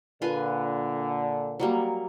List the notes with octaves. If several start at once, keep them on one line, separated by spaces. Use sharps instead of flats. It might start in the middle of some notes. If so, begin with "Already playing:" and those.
A#2 D3 F4 B4 G#5
F#3 G3 A#3